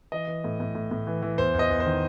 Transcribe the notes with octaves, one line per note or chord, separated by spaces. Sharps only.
E3 D#5
E3
A2
A2
A2
A2
E3
E3
E2 C5
E2
D#5
E2
C5
D#3